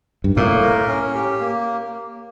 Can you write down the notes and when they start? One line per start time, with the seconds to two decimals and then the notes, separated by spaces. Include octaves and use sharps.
0.24 G2
0.36 A2 A#3
0.62 A#4
0.88 C#4
1.15 G4
1.40 A#3